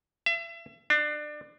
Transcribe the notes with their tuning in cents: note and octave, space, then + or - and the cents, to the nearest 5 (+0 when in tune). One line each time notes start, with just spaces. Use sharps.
E5 +35
D4 +25